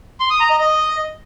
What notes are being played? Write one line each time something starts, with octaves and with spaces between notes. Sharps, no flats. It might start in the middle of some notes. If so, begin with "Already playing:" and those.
C6
D#6
A#5
D#5
D#5